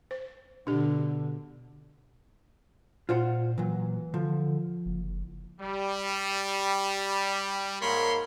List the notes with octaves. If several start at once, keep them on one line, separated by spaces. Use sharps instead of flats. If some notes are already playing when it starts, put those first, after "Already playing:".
C5
B2 D3 D4 G4
A#2 F4 C5 F#5
A#2 E3 F#3
D3 F3
F#1
G3
G#2 A#3 A#4 C#5 B5 C6